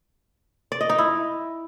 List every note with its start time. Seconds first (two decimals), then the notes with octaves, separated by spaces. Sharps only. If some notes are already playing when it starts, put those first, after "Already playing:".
0.72 D5
0.81 D#5
0.89 D#4
0.98 E4